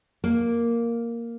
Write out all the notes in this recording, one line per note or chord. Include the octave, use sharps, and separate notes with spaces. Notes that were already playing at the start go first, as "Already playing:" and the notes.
A#3